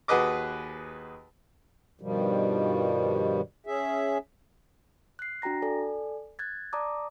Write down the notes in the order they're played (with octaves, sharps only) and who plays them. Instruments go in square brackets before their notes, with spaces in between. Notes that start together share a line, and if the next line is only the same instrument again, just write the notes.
[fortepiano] D#2 F#4 G#4 B4 D#5 D6
[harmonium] G2 B2 D#3 F3 G3
C#4 G#4 E5
[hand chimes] F#6 C7
D4 F#4 G5 A#5 A#6
A4 D5 G#5
F#6 G#6 A6
D5 A5 A#5 D6 D#6